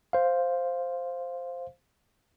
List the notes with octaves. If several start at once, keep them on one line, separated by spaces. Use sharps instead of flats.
C5 F5